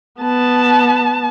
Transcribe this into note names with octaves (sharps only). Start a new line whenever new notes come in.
B3 A5